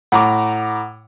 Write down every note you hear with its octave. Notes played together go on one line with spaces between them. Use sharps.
A2 F#5 A#5 D6